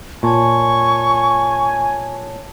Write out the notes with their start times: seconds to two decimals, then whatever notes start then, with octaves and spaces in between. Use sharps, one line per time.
0.23 A#2 C#5 G#5 A5 C#6